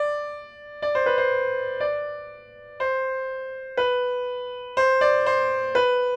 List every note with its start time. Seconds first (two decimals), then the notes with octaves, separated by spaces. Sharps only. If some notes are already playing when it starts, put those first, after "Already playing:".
Already playing: D5
0.82 D5
0.95 C5
1.06 B4
1.18 C5
1.80 D5
2.80 C5
3.77 B4
4.77 C5
5.01 D5
5.26 C5
5.75 B4